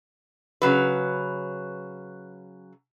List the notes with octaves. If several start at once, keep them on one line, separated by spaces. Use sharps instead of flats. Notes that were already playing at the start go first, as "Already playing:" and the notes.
C#3 F#3 B4